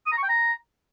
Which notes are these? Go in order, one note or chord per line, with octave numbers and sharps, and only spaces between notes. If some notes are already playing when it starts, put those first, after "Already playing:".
D#6
A#5
C#6
G5
A#5